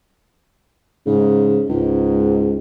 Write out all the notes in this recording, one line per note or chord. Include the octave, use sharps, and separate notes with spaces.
G#2 C#3
C#2 G#2